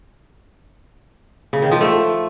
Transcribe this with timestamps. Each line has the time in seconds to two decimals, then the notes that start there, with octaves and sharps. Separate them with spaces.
1.53 C#3
1.62 D#3
1.71 F3
1.81 A3